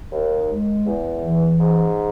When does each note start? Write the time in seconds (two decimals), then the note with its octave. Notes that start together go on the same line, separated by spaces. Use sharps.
0.12 D#2
0.49 G#3
0.86 E2
1.23 E3
1.60 G#2